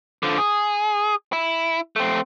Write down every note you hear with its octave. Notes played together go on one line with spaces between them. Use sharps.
D3 F3
G#4
E4
A3 C4